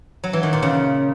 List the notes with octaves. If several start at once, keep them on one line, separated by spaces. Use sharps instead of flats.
F#3
E3
D#3
A#2
C#3